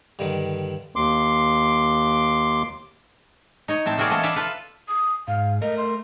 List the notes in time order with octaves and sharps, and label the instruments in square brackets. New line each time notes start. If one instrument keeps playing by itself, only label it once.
[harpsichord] G2 D3 D#3
[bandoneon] D#2 C6 D6
[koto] D#4 C#5 D#5
A2 C4 A5
A#3 C4 F#4 G#4 A#4 D5
E3 C#4 A4 D#5 A5
A4 B4 D5 E5 F5 A#5
F4 A4 B4
[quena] D#6
[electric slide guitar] G#2 [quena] F5
[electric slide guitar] A3 A#4 [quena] D#5
[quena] C6